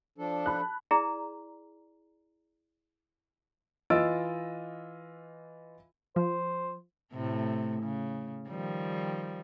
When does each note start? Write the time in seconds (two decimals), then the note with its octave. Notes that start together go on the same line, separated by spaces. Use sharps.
0.18 F3 D4 A4
0.46 A5 B5 F#6
0.91 E4 G#4 D5 A#5
3.90 E3 F4 D#5 E6 A6 D7
6.16 F3 C5
7.13 A2 C3 A3
7.83 C#3
8.48 D#3 F3 G3